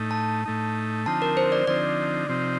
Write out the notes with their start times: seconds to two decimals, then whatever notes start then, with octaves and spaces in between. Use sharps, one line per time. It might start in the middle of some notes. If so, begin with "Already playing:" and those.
Already playing: A2 A3 D#4
0.11 A5
0.46 A2 A3 D#4
1.06 D3 F3 C4 D#4 A5
1.22 A#4
1.37 C5
1.52 D5
1.67 D3 F3 C4 D#4 D5
2.29 C3 F3 C4 D#4